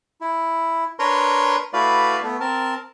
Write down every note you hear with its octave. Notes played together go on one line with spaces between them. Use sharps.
E4
D4 A#4 B4 C#5 A#5 C6
A3 E4 F#4 B4 D5 F5
A3 B3
C4 A#4 A5